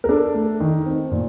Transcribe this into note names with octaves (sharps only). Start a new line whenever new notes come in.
A#4
D4 A4
A3
D#3
C4
A#2